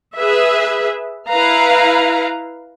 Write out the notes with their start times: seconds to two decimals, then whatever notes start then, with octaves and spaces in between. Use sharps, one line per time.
0.17 G#4 B4 E5
1.29 E4 B4 F5 A#5